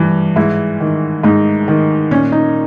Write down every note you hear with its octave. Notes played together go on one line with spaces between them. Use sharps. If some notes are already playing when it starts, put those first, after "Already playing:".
Already playing: G2 E3
G#2 E4
D#3
G#2 D#4
D#3
A#2 C#4
D#4